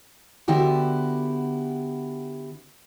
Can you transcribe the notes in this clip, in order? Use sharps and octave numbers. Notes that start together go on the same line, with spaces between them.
D3 B3 E4 F#4 G4